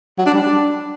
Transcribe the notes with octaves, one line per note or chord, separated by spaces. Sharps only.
F#3
D4
G3
D4